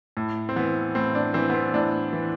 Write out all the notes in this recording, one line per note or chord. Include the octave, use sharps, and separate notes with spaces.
A2
C4
E3 B3
A2 C4
D4
E3 C4
B3
C4
A2 D4
E3